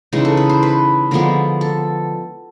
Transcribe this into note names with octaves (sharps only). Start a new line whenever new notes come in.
C#3 E3 G#3 D#4
A4
B4
C5
B4
D3 F3 G#3 B3 A#4
A4